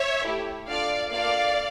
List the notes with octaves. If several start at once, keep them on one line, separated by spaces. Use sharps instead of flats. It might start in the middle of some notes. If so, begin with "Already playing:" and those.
Already playing: C#5 E5
A3 E4 G4
D4 F4 A4 D5 F5
A#3 D4 F4 A4 D5 F5